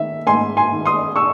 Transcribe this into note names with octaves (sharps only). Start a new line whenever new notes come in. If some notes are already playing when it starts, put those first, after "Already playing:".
Already playing: D#3 E5
G#2 G#5 C6
G#5 C6
D#3
C6 D#6
C#6 E6